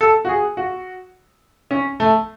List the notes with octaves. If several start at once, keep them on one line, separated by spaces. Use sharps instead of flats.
A4
F#4
G#4
F#4
C#4
A3